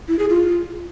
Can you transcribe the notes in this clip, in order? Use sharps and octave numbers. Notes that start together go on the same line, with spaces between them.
E4
G#4
F4